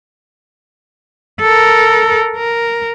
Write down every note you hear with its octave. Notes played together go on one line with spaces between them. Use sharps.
A4 A#4
A#4